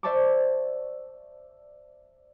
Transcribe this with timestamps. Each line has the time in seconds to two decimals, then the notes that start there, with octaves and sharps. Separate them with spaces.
0.03 C5 D5 E5 A5 C#6 D6